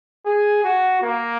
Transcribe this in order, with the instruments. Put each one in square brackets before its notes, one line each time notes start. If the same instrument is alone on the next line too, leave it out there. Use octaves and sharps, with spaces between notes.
[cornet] G#4
F#4
A#3